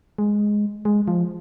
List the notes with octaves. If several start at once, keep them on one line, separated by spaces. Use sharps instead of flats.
G#3
G#3
F3